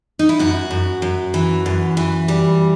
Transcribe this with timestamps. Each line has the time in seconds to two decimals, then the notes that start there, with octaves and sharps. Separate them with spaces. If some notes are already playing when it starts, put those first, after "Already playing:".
0.19 D#4
0.29 E4
0.39 F#2 F#4
0.71 F#2
1.02 F#2
1.34 E3
1.66 F#2
1.97 E3
2.28 G3